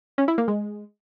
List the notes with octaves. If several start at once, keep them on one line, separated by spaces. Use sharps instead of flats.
C#4
E4
A#3
G#3